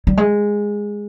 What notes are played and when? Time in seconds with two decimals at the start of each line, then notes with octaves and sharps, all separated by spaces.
0.07 G3
0.17 G#3